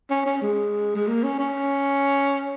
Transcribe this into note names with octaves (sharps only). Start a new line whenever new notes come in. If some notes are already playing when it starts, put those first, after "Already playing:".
C#4
C#4
G#3
G#3
A#3
C#4
C#4